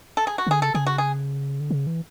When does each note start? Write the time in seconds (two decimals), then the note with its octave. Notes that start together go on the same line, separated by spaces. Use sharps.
0.17 A4
0.27 G#4
0.38 F#4
0.47 C#3
0.50 D3 G#4
0.62 C#3 A4
0.74 C#3 G#4
0.87 F#4
0.98 G#4
1.60 D3
1.71 C#3
1.87 E3